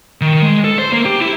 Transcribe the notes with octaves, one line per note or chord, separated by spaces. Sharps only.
D#3
G#3
A4
C5
A#3
G4
E4